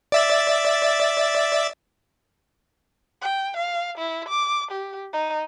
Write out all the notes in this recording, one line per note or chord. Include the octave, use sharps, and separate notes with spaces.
D5 E5 A6
G5
F5
E4
D6
G4
D#4